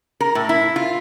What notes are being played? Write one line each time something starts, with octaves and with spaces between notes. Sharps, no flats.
A#4
A2
E4
F4